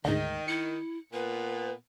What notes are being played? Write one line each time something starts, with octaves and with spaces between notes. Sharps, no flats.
D2 G#2 D#3 D#5
E4 C#7
A#2 B3 B4